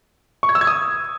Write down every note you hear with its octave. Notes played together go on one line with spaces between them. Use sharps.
C#6
G#6
E6
G#6
D#6